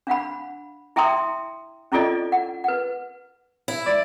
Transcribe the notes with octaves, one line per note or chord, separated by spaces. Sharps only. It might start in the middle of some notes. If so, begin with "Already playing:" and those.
D4 F5 F#5 B5
E4 E5 G5 A#5 C6 D#6
C#4 E4 F4 A4 D5 D#5
F#5
B4 F#5
E4
D5